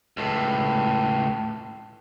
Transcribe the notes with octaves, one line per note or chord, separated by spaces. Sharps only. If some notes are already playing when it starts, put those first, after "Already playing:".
C#2 A2